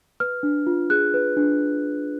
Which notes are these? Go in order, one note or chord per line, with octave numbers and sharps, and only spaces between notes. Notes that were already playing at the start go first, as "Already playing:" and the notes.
B4 F6
D4
F4
G#4 F#6
B4
D4